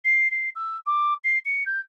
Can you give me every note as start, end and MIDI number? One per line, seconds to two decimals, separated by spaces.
0.04 0.30 96
0.31 0.49 96
0.55 0.77 88
0.86 1.14 86
1.24 1.38 96
1.45 1.63 97
1.66 1.80 91